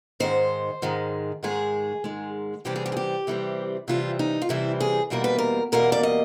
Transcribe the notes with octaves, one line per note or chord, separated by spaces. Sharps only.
G#2 D#3 G#3 C5
G#2 D#3 G#3
G#2 D#3 G#3 G#4
G#2 D#3 G#3
C3 E3 G3 C4 G4
G#4
G4
G#4
G4
C3 E3 G3 C4
C3 E3 G3 C4 F4
D#4
F4
C3 E3 G3 C4 E4
G#4
E2 B2 G3 A#3 A#4
B4
A#4
E2 B2 G3 A#3 A#4
D5
D#5